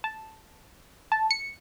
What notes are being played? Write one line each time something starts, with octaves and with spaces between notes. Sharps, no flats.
A5
A5
C#7